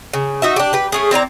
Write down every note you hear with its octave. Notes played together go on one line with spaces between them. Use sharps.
C#3
D#4 F#4 E5
D4 G4
G4 B4
A3 C#4 G#4
C4 E4 D5 A#5